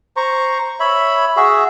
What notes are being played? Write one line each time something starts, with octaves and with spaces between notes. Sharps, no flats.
C5 A#5 C#6
C#5 E5 B5
F#4 G#4 E5